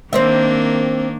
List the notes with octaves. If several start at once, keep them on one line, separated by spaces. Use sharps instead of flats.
D#3 A#3 C4 D4 C5 E5